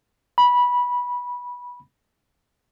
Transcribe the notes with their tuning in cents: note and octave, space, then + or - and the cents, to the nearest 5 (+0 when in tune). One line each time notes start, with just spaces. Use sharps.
B5 -15